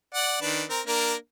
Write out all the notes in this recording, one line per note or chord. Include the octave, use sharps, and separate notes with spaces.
D5 F#5
D#3 D4 B4
C4 A#4
A#3 D4 A#4